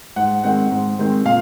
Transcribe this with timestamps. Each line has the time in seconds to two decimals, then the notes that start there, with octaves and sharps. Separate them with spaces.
0.16 G#2 F#5
0.43 D#3 G#3 C4 F#5
0.71 G#2
0.99 D#3 G#3 C4
1.26 A#2 F5